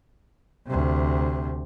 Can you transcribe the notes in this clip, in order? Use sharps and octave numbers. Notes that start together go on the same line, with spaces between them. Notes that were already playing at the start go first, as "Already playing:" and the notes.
D2 C3